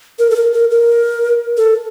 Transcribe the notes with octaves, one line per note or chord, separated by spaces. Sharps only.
A#4
A4
A#4
A#4
A#4
A4